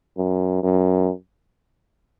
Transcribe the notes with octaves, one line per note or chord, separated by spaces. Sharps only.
F#2
F#2